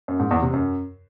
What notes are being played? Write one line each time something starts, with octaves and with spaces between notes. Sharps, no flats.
F#2
G#2
E2
C3
F#2